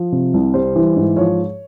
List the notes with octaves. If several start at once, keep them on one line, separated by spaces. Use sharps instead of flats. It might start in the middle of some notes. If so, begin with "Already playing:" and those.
Already playing: F3
C3
C2
G3 C5
E3
G#2
F3 C#5